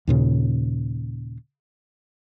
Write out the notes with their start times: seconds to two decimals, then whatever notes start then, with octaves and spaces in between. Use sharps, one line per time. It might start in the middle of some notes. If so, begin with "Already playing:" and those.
0.07 D#2 A#2 C#3